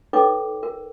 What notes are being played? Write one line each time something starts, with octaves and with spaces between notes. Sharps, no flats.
D#4 A4 B4 C#5 G5 D6
A#4